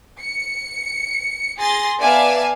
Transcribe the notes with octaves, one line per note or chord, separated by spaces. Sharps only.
C#7
G#4 C6 A6 A#6
B3 D5 E5 F5 G#5 A5